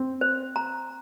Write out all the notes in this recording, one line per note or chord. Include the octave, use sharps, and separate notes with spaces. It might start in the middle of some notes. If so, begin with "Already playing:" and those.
Already playing: C4
C5
A#5